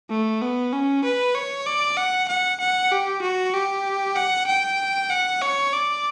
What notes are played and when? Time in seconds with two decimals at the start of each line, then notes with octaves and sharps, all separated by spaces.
0.10 A3
0.42 B3
0.73 C#4
1.04 B4
1.35 C#5
1.66 D5
1.97 F#5
2.28 F#5
2.60 F#5
2.92 G4
3.22 F#4
3.54 G4
4.16 F#5
4.47 G5
5.10 F#5
5.42 C#5
5.73 D5